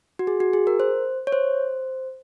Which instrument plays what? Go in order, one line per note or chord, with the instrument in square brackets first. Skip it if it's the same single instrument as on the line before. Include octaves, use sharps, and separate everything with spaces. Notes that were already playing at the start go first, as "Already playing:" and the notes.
[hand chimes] F#4
G#4
F#4
G#4
A#4
C5
C#5
C5